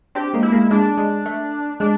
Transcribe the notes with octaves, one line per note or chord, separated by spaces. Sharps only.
C4 D4 G4
G#3 A#3
E4
G#3 A#3
G#3 D4
G#3
A3
G#3 D4